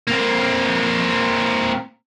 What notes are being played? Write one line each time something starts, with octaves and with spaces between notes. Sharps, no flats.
A#3 C4